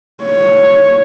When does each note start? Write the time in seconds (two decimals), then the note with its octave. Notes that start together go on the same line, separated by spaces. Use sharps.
0.24 C#5